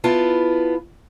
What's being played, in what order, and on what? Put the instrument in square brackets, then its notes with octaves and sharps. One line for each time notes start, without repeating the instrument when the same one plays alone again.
[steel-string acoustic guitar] B3 E4 F4 A5